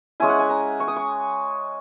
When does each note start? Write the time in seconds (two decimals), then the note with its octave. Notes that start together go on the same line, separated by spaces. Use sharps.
0.20 G#3 C#4 E4 G#5
0.29 F#5
0.39 G#5
0.49 A#5
0.80 C#6
0.88 D#6
0.96 C#6